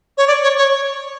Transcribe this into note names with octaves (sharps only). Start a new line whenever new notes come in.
C#5
D5
C#5
C#5